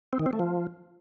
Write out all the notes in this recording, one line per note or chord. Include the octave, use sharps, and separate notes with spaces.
C4
D#3
C4
A3
F3